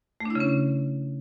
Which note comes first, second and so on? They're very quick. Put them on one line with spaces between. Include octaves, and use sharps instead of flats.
A3 D4 E4 C#3 C#4